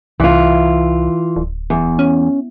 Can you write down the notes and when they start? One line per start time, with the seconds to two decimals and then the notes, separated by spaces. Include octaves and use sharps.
0.20 C2 E3 F4
1.36 D1
1.70 E2
1.99 C#4